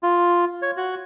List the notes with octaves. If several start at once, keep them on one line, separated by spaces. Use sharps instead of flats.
F4
C#5
F#4